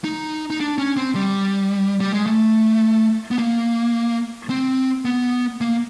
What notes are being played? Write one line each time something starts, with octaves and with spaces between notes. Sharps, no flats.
D#4
D#4
D4
C#4
C4
G3
G3
G#3
A3
B3
A#3
C4
B3
A#3